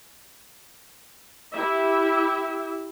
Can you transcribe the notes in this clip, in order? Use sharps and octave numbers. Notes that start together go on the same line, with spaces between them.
E4 G4 E5